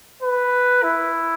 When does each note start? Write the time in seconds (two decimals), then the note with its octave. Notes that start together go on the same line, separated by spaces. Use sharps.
0.22 B4
0.83 E4